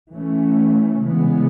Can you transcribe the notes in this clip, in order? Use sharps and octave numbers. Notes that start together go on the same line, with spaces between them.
E3 A3 C#4
C#3 E3 G#3 B3